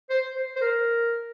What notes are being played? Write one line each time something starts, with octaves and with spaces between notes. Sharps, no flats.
C5
C5
C5
A#4